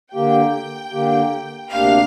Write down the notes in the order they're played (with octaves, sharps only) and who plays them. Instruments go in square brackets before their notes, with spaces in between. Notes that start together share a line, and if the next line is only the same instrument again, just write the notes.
[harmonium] D3 A#3 G4 [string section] G5
[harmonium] D3 A#3 G4
[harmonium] D2 C3 A#3 D4 G4 [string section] F5